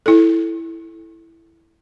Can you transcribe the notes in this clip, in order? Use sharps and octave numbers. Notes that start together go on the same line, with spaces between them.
E4 A4